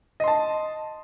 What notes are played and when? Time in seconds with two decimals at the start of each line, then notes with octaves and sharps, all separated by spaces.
0.20 D#5
0.24 C6
0.28 A5